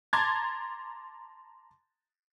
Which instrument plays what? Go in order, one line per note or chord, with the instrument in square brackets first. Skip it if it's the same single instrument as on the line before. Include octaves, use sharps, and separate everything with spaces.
[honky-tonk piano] A5 A#5 C6 D6 G#6 A6